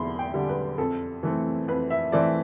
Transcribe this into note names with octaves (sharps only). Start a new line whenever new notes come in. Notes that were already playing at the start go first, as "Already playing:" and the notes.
Already playing: E2 D3 B5 C6
G5
D3 G3
B4
F2 A4
E3 A3 C4
F2 B4
E5
E3 A3 C4 D5